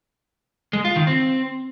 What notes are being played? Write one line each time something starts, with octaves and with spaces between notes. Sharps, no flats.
G#3
F4
D#3
C4